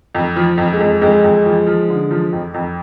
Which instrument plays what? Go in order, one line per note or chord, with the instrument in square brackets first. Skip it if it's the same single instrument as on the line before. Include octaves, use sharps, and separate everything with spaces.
[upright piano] F2
F3
F2
[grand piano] G#3
[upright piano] F2
[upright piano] F2 [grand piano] G#3
[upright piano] F2
F3
F3
D3
F3
F2
F2